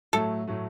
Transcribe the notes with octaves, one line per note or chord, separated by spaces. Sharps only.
A2 F#3 A3 A4
A2 F#3 A3